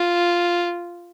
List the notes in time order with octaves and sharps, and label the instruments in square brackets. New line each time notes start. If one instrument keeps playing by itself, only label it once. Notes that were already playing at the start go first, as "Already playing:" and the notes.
Already playing: [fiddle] F4